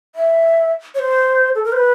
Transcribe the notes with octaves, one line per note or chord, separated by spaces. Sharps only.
E5
C#5
C5
A4
A#4
C5
B4